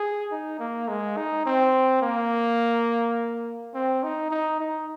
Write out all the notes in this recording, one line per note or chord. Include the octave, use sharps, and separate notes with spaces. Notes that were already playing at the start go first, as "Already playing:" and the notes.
Already playing: G#4
D#4
A#3
G#3
D#4
C4
A#3
C4
D#4
D#4
D#4